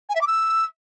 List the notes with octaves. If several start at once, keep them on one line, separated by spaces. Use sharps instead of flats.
G#5
E5
D6
E6